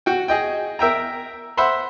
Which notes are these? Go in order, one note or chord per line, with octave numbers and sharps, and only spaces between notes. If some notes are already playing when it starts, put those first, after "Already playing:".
F#4 G5
G#4 D#5 G5
A#4 E5 G5 A#5
C5 E5 F#5 B5 C6